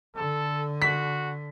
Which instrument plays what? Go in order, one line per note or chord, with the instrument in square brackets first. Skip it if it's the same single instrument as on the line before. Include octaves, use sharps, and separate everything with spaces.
[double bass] D3 [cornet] A4
[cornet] F#4 [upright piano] B6